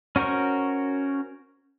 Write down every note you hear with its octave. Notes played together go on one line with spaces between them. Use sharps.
C#4 F#4 A#4 C5 C#6